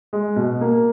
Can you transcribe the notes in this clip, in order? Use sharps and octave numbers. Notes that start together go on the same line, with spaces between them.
G#3
B2
A#3